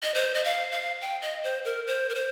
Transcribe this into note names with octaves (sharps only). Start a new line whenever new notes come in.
D#5
C5
D#5
F5
F5
G5
D#5
C5
A#4
C5
A#4
C5